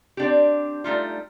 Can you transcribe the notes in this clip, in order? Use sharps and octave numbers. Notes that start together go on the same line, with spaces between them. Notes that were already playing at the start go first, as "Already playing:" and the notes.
C4 D4 G4
G3 A3 D#4 F4